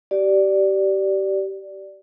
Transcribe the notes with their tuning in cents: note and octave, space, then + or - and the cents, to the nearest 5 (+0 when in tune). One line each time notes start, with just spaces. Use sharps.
G4 -25 D5 +0